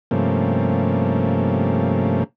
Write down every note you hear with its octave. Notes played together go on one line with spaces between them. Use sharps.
G2 C3 F3 A3 A#3 C#4